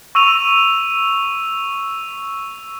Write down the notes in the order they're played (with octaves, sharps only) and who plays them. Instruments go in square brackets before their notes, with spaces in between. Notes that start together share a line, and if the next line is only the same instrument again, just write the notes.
[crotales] C#6 E6 D#7 F7